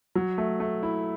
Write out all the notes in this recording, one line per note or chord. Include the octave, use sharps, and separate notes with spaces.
F#3
A3
A3
E4